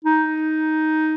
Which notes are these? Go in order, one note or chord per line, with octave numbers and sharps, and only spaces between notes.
D#4